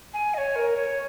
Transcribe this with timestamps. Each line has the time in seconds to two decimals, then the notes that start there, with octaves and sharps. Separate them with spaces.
0.14 G#5
0.34 D#5
0.38 C#5
0.56 A#4
0.76 C#5